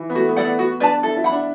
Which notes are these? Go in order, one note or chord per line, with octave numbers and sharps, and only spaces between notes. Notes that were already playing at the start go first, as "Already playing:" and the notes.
Already playing: E3
B3
A3 F#4
B3
A4 D5 F#5
B3
B3 F#4
D4 B4 D5 A5
E4 A4
E4
F#5 B5
D4